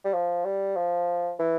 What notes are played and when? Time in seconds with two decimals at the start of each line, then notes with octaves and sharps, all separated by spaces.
0.05 G3
0.13 F3
0.45 G3
0.76 F3
1.39 E3